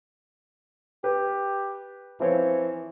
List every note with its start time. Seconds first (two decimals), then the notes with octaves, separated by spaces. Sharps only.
1.04 G4 B4
2.20 E3 F3 C4 C#5